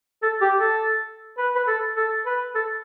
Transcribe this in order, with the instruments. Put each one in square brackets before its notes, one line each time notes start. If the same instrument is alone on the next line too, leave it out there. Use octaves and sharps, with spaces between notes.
[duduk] A4
G4
A4
B4
B4
A4
A4
B4
A4